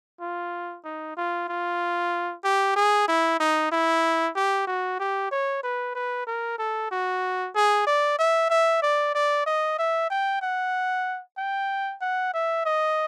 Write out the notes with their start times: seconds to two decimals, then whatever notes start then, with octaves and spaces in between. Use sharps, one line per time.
0.20 F4
0.85 D#4
1.17 F4
1.48 F4
2.44 G4
2.76 G#4
3.08 E4
3.40 D#4
3.72 E4
4.36 G4
4.67 F#4
5.00 G4
5.31 C#5
5.63 B4
5.95 B4
6.27 A#4
6.58 A4
6.91 F#4
7.55 G#4
7.86 D5
8.19 E5
8.50 E5
8.82 D5
9.14 D5
9.46 D#5
9.78 E5
10.10 G5
10.42 F#5
11.38 G5
12.01 F#5
12.34 E5
12.65 D#5